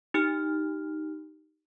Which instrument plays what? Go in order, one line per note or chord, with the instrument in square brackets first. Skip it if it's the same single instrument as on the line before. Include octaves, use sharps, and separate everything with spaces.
[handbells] D#4 G4 F6